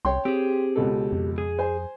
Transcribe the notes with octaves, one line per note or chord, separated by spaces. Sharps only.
C2 C#5 G5 C6
C4 G4 G#4
C#2 B2 A4
F2
G#4
C5 G#5